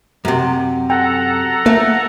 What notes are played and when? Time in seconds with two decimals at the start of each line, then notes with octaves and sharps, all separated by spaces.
0.25 F#2 C3
0.90 A4 F#5 G5 A#5
1.66 A3 A#3